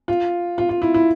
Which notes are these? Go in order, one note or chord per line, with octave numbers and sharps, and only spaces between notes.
F4
F4
F4
E4
E4